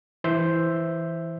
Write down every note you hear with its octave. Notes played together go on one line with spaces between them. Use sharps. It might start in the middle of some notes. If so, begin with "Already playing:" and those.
E3 C5 E5 G6